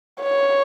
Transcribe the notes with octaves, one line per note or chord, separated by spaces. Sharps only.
C#5